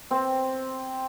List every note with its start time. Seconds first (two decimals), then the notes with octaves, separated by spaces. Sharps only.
0.11 C4